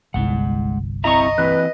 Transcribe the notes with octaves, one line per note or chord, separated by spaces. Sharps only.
G1 C2 G#3 F#5
C4 E4 D#5 E5 A#5 C#6
E3 C4 E4 B4